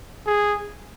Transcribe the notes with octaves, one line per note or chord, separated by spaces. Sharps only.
G#4